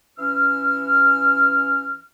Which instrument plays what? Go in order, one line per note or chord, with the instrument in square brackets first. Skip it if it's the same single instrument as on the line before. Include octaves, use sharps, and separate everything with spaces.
[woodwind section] E3 C#4 E6 F6